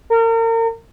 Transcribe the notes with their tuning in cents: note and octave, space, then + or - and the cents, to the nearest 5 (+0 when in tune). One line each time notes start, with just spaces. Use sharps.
A#4 -35